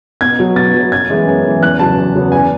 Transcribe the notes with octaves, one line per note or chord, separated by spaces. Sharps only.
B2 G#6
F#3 B3
B2 A6
F#3 B3
F#2 G#6
E3 G#3 B3
F#2
E3 G#3 B3
E2 F#6
C#3 F#3 B3 A5
E2
C#3 F#3 B3
E2 G#5